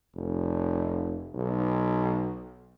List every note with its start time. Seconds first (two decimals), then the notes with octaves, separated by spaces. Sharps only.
0.15 F1
1.35 B1